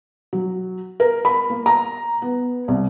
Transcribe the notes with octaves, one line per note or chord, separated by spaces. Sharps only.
F#3
A#4
B5
A#3
A#5
B3
C2